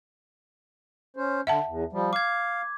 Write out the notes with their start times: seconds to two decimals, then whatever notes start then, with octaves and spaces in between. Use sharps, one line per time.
1.17 C#4 C5
1.47 D3 E5 F#5 A5
1.67 E2
1.93 F3 G3
2.13 F5 D6 G#6